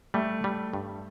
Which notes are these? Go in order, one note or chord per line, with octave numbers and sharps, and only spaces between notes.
G3 A3
G3
G2